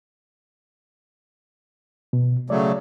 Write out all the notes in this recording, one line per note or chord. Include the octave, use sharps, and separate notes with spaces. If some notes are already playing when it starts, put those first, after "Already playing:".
B2
C#3 F#3 A3 D5